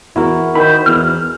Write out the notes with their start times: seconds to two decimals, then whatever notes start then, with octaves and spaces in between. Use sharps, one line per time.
0.16 E2 E4 F#4 A#4
0.55 D#3 C5 B5
0.86 E2 F6